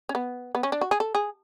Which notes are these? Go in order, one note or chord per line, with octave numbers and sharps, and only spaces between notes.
C#4
B3
B3
C#4
D4
F#4
G#4
A4
G#4